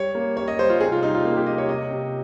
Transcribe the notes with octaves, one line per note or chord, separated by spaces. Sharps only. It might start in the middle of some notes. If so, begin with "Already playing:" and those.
Already playing: G3 C#5
A#3
G3 C#5
D#5
G3 C5
F4
C3 G#4
F4
G3 D#4
F4
A#3 F4
G4
C3 D#5
C#5
C3 D#5
C3